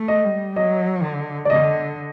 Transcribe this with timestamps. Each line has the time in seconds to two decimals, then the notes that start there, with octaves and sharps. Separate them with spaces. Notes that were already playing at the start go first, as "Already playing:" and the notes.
Already playing: A3
0.08 D#5
0.25 G3
0.56 F#3 D#5
1.04 D3
1.45 D5
1.50 D3 D#5